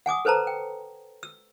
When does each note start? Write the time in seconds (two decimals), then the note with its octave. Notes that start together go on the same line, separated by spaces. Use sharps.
0.06 F#5 G#5 D6 D#6
0.25 A4 B4 C5 A5 A#5
0.47 G5
1.23 E6